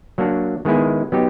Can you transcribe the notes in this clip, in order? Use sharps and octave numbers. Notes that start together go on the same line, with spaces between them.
F#3 A#3 D4 F#4
D#3 G#3 B3 E4 G#4
F#3 B3 D#4 G4